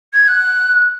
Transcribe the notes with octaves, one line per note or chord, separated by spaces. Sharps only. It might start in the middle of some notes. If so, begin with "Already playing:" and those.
G#6
F#6